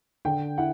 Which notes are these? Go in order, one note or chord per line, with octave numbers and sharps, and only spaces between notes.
D3 G5
E4 F#5